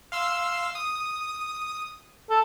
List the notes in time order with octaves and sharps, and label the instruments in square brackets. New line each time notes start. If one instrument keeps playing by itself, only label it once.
[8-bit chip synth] F5 C6 E6
D#6
[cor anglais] A4